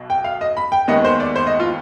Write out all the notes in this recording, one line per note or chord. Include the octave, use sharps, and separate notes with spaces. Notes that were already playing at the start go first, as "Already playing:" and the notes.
Already playing: B1 B2
G5
F5
D#5
B5
G5
D#2 D#3 G#3 B3 D#5
C5
D5
C5
D#5
F4